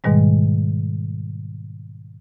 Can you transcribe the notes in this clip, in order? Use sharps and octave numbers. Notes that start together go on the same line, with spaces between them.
G#2 B2 D#3 G3 G#3